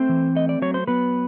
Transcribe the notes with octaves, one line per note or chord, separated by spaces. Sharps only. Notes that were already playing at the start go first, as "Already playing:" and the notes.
Already playing: A3 C4 C5
E3
A3 D#5
D5
F#3 C#5
C5
F#3 B3 B4